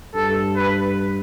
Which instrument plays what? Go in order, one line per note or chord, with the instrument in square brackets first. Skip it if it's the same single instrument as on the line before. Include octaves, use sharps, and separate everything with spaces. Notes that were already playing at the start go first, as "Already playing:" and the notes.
[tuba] G2 [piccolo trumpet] A4
[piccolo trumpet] B4